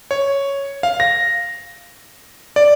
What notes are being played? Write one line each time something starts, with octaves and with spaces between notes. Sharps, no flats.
C#5
F5
A#6
D5